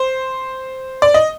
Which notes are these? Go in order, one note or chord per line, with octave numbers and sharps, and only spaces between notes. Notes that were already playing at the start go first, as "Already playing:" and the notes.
Already playing: C5
D5
D#5